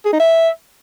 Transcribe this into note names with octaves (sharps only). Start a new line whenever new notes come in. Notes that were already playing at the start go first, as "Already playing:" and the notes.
G#4
D#4
E5